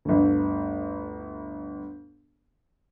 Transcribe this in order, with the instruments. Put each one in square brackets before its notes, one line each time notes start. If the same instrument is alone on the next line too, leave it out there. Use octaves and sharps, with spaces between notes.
[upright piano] G1 D2